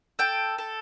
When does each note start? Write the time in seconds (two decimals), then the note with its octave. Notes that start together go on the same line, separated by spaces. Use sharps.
0.19 A4 G5
0.58 A4